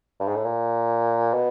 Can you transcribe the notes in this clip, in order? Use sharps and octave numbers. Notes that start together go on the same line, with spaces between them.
G2
G#2
A2
A#2
B2